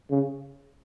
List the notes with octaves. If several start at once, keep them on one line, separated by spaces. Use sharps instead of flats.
C#3